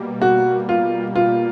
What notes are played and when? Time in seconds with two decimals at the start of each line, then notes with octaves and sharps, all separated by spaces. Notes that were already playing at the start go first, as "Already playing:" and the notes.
Already playing: B2 G3 A#3
0.22 F#4
0.69 F4
1.15 F4